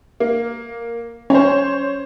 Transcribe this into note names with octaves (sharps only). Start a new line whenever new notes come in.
A#3
C#4 C5 C#5